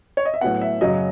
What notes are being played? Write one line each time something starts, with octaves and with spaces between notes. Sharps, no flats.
C#5
D#5
E5
A2 F#3 B3 F#5
E5
F#2 C#3 F#3 C#4 D#5